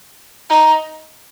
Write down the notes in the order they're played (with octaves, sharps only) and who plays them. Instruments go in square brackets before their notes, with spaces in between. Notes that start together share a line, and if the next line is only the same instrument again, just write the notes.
[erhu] D#4